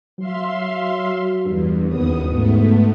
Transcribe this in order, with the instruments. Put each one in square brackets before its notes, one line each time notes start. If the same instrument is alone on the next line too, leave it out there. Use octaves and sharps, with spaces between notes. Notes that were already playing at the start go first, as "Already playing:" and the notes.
[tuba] F#3 [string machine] E5 F5 C6
[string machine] E2 [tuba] G2
[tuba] F#1 [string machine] D#2 B3 D#6
[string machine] G#2 A3 B3